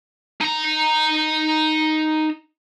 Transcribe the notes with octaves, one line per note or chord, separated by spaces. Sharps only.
D#4 A#5